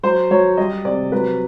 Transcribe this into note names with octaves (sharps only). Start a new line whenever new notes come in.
F#3 C5
F#3 C#5
G3 D#5
C3 D5
F#3 B4